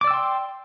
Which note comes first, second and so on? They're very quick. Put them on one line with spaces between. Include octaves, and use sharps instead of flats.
D6 D5 E6 G5 C6